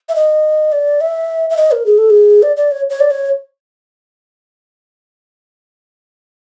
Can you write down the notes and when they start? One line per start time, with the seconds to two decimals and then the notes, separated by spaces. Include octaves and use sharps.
0.09 E5
0.15 D#5
0.72 D5
1.01 E5
1.50 E5
1.57 D#5
1.72 A#4
1.86 G#4
1.98 A4
2.10 G#4
2.42 D5
2.57 D5
2.71 C#5
2.90 C#5
3.00 D5
3.11 C#5